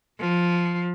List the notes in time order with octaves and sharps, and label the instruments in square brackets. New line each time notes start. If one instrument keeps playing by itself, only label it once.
[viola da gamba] F3